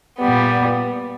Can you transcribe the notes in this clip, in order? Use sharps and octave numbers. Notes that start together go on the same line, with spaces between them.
A#2 G3 B3